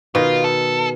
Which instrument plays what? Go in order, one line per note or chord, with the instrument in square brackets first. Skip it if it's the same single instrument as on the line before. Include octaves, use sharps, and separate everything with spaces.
[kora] B2 D#3 [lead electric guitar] F4
[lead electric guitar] A4